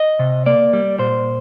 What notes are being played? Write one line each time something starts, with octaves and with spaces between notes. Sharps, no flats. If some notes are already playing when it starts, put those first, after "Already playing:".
Already playing: D#5
C3
A#3 D5
G3
A#2 C5